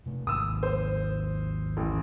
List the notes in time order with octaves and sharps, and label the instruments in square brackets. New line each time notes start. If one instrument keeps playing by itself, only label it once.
[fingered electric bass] C3 A3
[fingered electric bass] G#1 D#2 G#2 [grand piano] D#6 E6
[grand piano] C5
A1